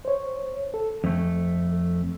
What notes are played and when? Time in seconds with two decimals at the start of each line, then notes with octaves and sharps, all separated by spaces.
0.05 C5 C#5
0.74 A4
1.04 F2 A3